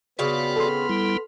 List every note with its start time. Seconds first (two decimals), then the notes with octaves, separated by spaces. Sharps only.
0.19 C#3 B3 C4 F4 F#4 D5 B5 F6
0.57 A4 C6
0.89 G3 E4